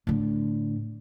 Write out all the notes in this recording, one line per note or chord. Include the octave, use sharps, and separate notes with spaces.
A2 D3